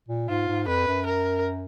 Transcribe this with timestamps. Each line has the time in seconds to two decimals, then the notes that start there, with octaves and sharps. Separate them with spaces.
0.08 A#2
0.29 G#2 F4
0.48 G#2
0.67 F2 B4
0.88 F#2
1.06 A#4